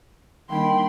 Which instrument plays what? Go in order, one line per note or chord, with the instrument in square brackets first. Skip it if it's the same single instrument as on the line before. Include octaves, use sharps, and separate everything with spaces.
[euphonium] D#3 [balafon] G3 A#3 D4 [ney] G5 [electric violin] B5 C6